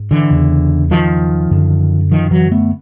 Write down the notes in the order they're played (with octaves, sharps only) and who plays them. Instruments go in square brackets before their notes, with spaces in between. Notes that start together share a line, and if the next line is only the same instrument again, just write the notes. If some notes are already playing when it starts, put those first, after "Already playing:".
Already playing: [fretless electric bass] G#2
D3 E3
E2 C#3
D#3 F3
F#2 D3
D#3 F3
E3 F#3
A3 B3